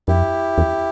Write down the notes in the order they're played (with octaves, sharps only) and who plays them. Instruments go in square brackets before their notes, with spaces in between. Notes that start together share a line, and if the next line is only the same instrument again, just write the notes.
[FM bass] F2 [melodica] E4 G4
[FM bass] E2